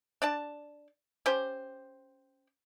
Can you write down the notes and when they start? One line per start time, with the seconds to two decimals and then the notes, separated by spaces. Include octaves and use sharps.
0.22 D4 D5 A5
1.26 C#4 G4 C5